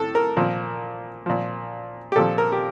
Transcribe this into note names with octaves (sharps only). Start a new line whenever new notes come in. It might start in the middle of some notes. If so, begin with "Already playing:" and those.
Already playing: A2 A4
A#4
A#2 F3
A#2 F3
G4
A#2 F3 A4
A#4
G4